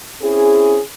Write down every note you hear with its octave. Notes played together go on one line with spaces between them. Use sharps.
C4 C#4 E4 G#4